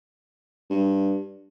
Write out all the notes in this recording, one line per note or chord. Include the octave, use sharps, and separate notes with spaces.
G2